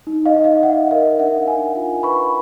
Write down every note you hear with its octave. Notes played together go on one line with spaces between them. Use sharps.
D#4
D#5 F5
D#4
D#5 F5
D#4 E5 F#5
A#4 D#5 F5
D4 E5 F#5
D4 F#5 G#5
F4
B4 B5 C#6